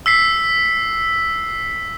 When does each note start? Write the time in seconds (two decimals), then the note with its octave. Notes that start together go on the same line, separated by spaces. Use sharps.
0.06 E6 B6 C7